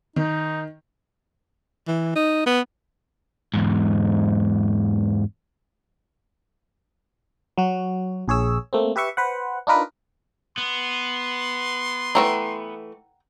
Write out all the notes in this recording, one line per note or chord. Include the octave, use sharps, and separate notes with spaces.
D#3 D#4
E3
D#4
B3
E2 G#2
F#3 F#4
A#1 G#4 C#5 E6
A3 A#3 C4
G4 B4 E5 C#6
B4 C5 F#5
D4 D#4 F4 A#4 B4
B3 C6
E3 F3 A3 F#5 G5 A#5